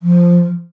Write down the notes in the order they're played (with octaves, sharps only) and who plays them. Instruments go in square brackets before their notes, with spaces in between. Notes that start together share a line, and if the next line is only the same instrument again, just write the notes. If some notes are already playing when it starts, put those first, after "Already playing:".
[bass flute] F3